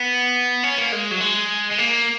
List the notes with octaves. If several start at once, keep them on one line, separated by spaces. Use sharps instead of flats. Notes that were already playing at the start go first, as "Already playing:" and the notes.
Already playing: B3
C#4
A#3
G#3
F#3
G#3
G#3
A#3